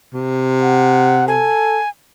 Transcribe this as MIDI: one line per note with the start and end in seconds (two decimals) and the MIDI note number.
0.13 1.51 48
0.63 1.25 78
1.28 1.81 69
1.28 1.89 80